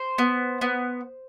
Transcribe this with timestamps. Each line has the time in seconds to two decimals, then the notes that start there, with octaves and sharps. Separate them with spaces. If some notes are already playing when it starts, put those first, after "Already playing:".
Already playing: C5
0.18 B3
0.61 B3